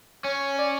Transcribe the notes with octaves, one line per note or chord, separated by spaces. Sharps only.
C#4 C#5
D5